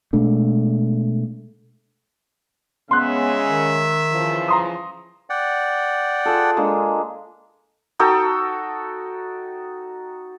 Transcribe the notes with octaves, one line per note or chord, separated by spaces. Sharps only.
B2 G#3 A3 D4
C#3 G#3 B3 C#4 E5 C6 F#6
D#3
C#3 E3 F3
A#5 C6 D#6
D5 F#5 G5
F4 G#4 A4
G#3 A#3 D4
D#4 F#4 A4 G5